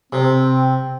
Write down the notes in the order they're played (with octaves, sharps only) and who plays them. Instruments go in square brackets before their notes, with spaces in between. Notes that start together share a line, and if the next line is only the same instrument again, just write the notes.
[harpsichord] C3 [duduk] C4